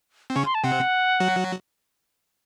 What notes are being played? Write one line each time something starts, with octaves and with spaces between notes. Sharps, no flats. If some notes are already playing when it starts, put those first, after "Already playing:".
C4
C#3 C#4 C#6
C6
A5
C3 C4 F#5
F#3 F#4